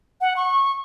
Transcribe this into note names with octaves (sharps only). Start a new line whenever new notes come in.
F#5
C#6